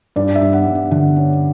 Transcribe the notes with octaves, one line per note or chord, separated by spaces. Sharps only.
G2 D5
E5
G2
F#5
G2
D3 F#5
C#4